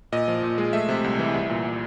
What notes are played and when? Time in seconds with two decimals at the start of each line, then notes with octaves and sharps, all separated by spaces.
0.12 A#2 D#5
0.28 F3
0.43 A#2
0.58 G#3
0.73 A3 E5
0.89 C3
1.04 C2
1.19 E3
1.34 C2
1.50 A#2